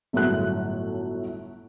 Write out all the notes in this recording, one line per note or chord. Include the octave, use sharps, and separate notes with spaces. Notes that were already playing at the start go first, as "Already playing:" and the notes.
G1 A2 F#3 A3 F#6